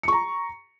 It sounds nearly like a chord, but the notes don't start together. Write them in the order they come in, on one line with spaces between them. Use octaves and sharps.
C#7 C#6 A#5